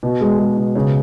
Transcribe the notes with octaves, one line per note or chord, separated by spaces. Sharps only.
B2
G#3
G#3
B2
C#3 C#5